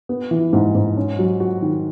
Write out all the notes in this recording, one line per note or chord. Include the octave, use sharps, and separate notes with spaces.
B3
E3
G#2
G#2
C#4
F#3
F#4
D#3